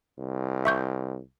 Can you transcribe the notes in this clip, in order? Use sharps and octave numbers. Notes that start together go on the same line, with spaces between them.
C2
E5 C#6 G6